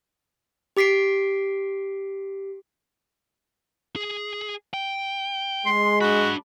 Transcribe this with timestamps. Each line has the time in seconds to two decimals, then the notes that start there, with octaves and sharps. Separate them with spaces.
0.77 G4 D6 B6 C7 D7
3.96 G#4
4.74 G5
5.66 G#3 C6
6.01 D4 F#4 B5